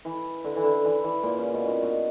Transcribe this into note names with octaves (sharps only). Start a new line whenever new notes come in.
E3
D3
E3
D3
E3
E3
A#2
C#3
B2
A#2
B2